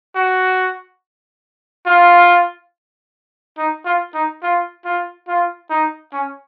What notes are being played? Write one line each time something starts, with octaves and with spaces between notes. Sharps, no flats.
F#4
F4
D#4
F4
D#4
F4
F4
F4
D#4
C#4